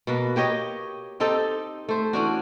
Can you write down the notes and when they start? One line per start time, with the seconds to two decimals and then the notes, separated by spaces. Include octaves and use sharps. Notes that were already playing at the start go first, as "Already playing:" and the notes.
0.07 B2 A#3 B4
0.36 A#3 G4 C#5 D#5
1.20 C4 D#4 G4 A4
1.89 A3 C5
2.13 E3 C#4 D4 F#4